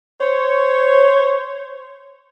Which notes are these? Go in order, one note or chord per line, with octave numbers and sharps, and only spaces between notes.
C5 C#5